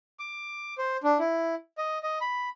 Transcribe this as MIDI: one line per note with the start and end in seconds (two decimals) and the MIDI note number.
0.20 0.74 86
0.78 0.97 72
1.03 1.18 62
1.19 1.55 64
1.78 1.98 75
2.03 2.18 75
2.21 2.49 83